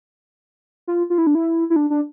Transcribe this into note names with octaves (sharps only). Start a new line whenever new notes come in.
F4
F4
E4
D4
E4
E4
D4
D4